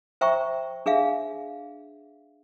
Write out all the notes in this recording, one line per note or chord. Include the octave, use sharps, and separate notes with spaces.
C5 E5 G5 A#5 C#6
D4 G#4 E5 F5